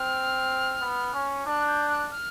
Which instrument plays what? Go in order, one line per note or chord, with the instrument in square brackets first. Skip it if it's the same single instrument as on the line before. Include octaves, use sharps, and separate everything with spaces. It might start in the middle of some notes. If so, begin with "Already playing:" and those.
Already playing: [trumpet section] C4 [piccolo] F6
[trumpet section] B3
C#4
[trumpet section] D4 [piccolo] F#6
[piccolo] G6
F#6
F6